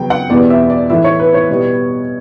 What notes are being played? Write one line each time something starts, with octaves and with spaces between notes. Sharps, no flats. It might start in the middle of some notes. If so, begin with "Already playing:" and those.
Already playing: C#3 F#3 B3 G5
F#5
E2 B2 G3 B3 D5
E5
D5
A2 E3 A3 E5
C#5
B4
C#5
B2 G3 B3